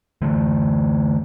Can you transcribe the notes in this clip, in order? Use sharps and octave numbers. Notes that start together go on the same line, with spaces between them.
D3 E3 A3